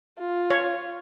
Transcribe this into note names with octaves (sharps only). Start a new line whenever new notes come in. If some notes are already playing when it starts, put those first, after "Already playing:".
F4
C#5